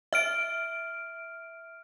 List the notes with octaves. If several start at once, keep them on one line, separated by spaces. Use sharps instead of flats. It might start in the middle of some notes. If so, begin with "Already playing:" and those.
E5 F6 D7